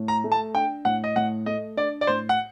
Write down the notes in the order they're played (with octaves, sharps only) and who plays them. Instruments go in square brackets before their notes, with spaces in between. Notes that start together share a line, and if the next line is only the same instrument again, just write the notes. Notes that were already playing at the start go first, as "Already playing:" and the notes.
Already playing: [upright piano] A2
[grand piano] A#5
[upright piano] A3
[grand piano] A5
[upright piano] D4 [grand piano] G5
[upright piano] A2 [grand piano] F#5
[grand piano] D#5
[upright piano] A2 [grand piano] F#5
[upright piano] A3 [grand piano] D#5
[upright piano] D4 [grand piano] D5
[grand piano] D5
[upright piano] A2 [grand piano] C5
[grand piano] F#5